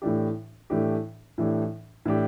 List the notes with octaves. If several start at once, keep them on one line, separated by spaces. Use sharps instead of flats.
A2 E3 A3 D4 G4
A2 E3 A3 D4 G4
A2 E3 A3 D4 G4
A2 E3 A3 D4 G4